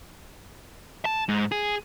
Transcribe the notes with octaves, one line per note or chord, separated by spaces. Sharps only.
A5
G#2
G#4